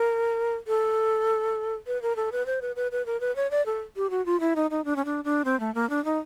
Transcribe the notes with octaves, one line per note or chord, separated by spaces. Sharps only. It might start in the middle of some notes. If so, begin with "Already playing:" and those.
Already playing: A#4
A4
B4
A#4
A4
B4
C5
B4
B4
B4
A#4
B4
C#5
D5
A4
G4
F#4
F4
E4
D#4
D#4
D4
C#4
D4
D4
C4
A3
A#3
D4
D#4